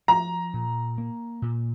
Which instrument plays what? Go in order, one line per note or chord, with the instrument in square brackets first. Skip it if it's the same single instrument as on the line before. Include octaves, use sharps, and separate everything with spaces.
[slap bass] F3 [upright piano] A#5
[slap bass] A#2
A#3
A#2